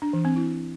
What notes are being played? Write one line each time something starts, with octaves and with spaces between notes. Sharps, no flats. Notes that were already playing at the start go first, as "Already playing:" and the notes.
D4
E3
C4
E4